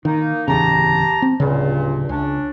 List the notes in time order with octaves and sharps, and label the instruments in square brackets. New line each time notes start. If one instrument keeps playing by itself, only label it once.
[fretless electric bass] D#3 [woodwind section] A#3 D#4
[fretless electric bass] D1 E2 C#3 [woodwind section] G4 A5 A#5
[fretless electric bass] C4
[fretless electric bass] D1 C#3 [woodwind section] C#2 G2 A#2
[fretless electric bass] C#2 [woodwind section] C#4 D4